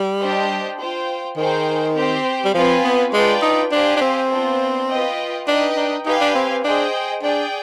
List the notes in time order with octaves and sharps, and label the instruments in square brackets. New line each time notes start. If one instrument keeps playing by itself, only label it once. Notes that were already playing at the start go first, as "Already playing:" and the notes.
Already playing: [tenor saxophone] G3
[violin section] D4 G4 C5 D#5 G5
F4 C5 G5
[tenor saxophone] D#3 [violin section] D#4 G#4 C5 G5
[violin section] C4 G4 C5 G5
[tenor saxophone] G3
[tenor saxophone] F3 [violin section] C4 F4 B4 F5 G#5
[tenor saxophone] B3
[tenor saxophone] G#3 [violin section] D4 F4 B4 D5 G5
[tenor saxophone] D#4
[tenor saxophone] D4 [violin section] G4 C5 F5 G#5
[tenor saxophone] D4
C4
[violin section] B3 D4 F4 C5
F4 B4 D#5 G5
[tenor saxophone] D4 [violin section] D#4 B4 D#5 G5
[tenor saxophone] D4
[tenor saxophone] D#4 [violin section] G4 B4 F5 G#5
[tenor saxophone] D4
C4
C4
[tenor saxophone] D4 [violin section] G#4 C5 D#5 G5
[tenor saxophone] D4 [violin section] G#4 D5 G5